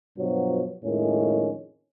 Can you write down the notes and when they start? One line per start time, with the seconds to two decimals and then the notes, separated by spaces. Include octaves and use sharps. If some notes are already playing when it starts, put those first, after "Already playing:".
0.17 G2 B2 F3 F#3
0.83 F2 A2 D#3 G#3 C#4